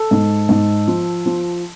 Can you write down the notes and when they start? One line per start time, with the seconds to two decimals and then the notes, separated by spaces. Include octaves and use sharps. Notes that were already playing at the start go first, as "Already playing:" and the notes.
Already playing: A4
0.11 G#2
0.49 G#2
0.88 F3
1.26 F3